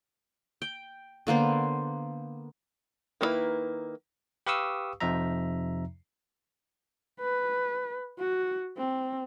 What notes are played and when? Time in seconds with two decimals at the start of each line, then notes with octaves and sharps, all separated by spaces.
0.62 G5
1.27 D3 A#3 B3 C5
3.21 D#3 A#3 D#4 E4 B4
4.46 G4 B4 F5 C#6 D#6 E6
5.01 F2 C3 F3 D#4 E5 A#5
7.20 B4
8.19 F#4
8.78 C4